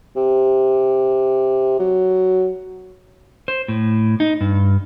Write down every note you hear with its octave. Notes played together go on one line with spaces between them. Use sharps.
C3
F#3
C5
A2
D#4
G2